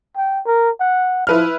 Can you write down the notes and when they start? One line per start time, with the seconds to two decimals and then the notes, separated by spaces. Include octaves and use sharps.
0.16 G5
0.46 A#4
0.80 F#5
1.27 F3 E4 B4 F6